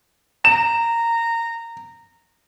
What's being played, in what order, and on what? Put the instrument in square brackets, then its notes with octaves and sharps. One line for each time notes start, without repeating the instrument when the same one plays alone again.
[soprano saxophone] A#5 [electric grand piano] E7